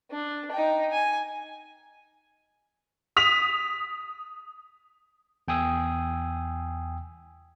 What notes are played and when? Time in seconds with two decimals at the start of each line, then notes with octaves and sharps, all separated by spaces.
0.11 D4
0.51 D#4 G5
0.91 G#5
3.17 D#6 B6 F7
5.48 E2 G5 G#5 D#6 E6